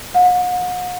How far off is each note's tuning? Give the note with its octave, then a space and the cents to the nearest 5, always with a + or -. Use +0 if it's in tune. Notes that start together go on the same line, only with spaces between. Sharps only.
F#5 -40